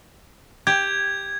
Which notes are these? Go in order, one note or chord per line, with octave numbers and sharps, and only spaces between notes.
G4 G#6